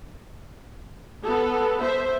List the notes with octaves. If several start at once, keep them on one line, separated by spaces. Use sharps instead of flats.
B3 A4
C5 E5